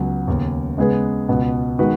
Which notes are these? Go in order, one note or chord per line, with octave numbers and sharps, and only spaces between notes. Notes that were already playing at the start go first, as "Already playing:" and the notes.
Already playing: C#2 C#3 F#3 B3
D#2 C#3 B3
C#3 G#3 B3 G#4 B4
C#2 B2 B3
D#3 G#3 B3 F#4 B4